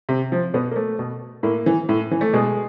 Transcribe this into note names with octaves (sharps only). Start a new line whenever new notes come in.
C3
F3
B2 B3
A#3
A3
B2
A2 A#3
E3
A2
E3
A3
B2 G#3